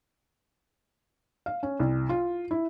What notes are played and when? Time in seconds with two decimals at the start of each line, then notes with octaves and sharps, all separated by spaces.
1.46 F5
1.63 C#4
1.80 C2
2.09 F4
2.51 E4